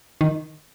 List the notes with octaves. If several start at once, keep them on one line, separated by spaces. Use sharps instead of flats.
D#3